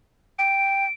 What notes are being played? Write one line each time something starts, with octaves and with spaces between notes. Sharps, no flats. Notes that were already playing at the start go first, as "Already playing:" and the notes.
G5 D7